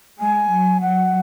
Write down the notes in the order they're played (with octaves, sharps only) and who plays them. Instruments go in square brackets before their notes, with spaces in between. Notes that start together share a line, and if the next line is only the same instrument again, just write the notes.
[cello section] G#3 [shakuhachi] G#5
[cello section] F#3
[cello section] F#3 [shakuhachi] F#5